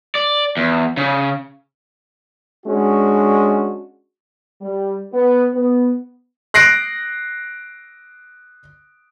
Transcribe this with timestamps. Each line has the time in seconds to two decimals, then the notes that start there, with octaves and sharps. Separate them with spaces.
0.15 D5
0.57 E2
0.97 C#3
2.66 G#3 C#4 D4 F#4
4.62 G3
5.13 B3
5.54 B3
6.54 F#6 A#6 C7 D7